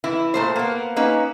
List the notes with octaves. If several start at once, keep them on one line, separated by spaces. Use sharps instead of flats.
E3 E4
A#2 A3 C5
A#3 B3
A#3 C#4 D#4 B4